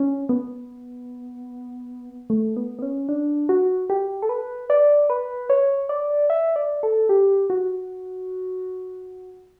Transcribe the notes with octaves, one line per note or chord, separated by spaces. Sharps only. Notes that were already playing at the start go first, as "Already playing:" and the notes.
Already playing: C#4
B3
A3
B3
B3
C#4
D4
F#4
G4
A4
B4
D5
B4
C#5
D5
E5
D5
A4
G4
F#4